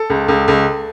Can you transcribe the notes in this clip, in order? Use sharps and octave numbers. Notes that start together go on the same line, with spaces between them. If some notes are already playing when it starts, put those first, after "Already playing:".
Already playing: A4
C#2
C#2
C#2